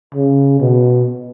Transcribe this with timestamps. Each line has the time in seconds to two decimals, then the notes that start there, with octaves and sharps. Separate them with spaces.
0.14 C#3
0.60 B2